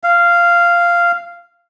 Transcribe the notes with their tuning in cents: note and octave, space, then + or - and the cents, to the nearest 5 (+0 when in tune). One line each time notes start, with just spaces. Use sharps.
F5 -10